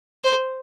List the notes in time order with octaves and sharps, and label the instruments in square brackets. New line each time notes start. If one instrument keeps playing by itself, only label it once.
[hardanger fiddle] C5